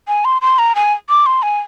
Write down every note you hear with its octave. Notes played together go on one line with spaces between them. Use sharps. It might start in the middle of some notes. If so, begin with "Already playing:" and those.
G#5
C6
C6
A#5
G#5
D6
C6
G#5